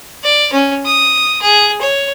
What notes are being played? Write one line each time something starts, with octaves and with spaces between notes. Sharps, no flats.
D5
C#4
D#6
G#4
C#5